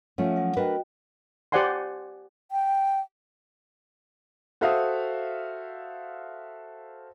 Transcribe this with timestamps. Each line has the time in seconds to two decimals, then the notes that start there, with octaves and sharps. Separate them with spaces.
0.18 F3 A3 C#4 E5 F#5
0.36 F#3 F#5
0.57 D4 F#4 A#4 B4 D#5 G5
1.52 G4 C5 D5 F#5 G#5 C6
2.51 G5
4.61 F#4 A4 C5 E5 F5 D#6